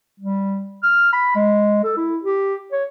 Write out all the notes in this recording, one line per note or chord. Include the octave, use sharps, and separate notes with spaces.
G3
F6
B5
G#3
A4
E4
G4
C#5